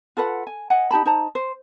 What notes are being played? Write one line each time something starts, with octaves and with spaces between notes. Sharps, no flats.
F4 A4 B4 F#5
G#5
D#5 F#5 G#5
D#4 G4 A5 B5
D#4 C5 A5 A#5
C5